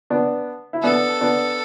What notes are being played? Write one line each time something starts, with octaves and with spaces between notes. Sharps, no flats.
B3 D4
E4
B3 D4 A4
B3 D4